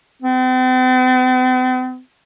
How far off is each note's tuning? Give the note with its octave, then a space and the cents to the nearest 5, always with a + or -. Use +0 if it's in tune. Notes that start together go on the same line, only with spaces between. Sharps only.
C4 -45